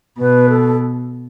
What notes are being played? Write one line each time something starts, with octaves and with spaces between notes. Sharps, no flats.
B2 B4
A4